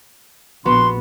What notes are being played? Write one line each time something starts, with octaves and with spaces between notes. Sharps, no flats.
A#1 B3 F#4 C6